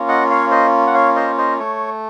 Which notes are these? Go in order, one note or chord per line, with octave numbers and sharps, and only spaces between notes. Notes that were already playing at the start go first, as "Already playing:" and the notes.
Already playing: A#3 C#4 F4
D#5 F#5
C#5 F5
C5 D#5
F#5
C#5 F5
C5 D#5
C5 D#5
A3 C#5